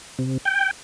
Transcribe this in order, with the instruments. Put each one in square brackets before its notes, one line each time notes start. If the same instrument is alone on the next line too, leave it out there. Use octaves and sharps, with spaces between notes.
[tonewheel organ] C3
G5